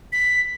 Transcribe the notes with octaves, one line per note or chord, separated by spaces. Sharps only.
B6